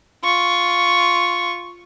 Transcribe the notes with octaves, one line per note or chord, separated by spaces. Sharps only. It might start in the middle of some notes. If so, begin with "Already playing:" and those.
F4 C#6